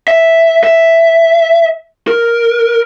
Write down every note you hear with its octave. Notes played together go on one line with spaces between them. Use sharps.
E5
E5
A#4